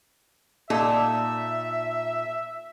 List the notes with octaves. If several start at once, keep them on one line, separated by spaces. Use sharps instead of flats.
A#2 D#4 A4 E5